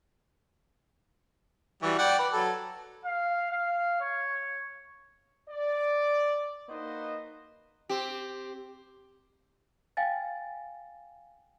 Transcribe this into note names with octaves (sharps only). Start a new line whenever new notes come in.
E3 G3 F#4
D5 F#5 G5
B4
F#3 A4
F5
F5
C#5
D5
A#3 D#4 F#4 B4 C5 D#5
C4 G4
F5 G5 G#5 A6